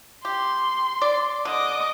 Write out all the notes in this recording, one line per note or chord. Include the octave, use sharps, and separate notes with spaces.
G4 C6
D5
D3 D#5 D6